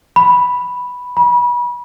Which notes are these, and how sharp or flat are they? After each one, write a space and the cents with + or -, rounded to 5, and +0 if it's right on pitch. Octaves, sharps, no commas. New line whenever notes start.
B5 +0
B5 -30